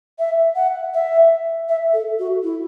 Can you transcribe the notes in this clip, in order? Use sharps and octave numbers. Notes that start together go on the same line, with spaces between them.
E5
F#5
E5
E5
A4
F#4
E4